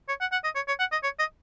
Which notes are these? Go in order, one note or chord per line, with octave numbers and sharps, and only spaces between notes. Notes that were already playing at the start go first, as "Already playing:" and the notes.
C#5
F#5
F#5
D#5
C#5
C#5
F#5
D#5
C#5
D#5